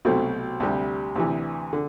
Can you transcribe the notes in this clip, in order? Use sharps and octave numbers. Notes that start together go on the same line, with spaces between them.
C2 B2 F#3 A3 C4
D2 C3 G3
D2 C3 E3
D3